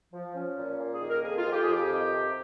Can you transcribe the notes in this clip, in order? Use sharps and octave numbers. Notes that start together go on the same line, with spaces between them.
F3
C#4
A#2
A#3
G#4
D#3
A#4
F2 G#4
F4
F2
G4
F2 G#4
G4
D#3
C3